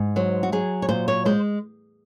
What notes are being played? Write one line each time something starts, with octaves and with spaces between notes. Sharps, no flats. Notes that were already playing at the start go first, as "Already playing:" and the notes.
Already playing: G#2
F#3 C5
F#4
F#3 G#4
C#5
A#2 C5
C#5
G#3 C5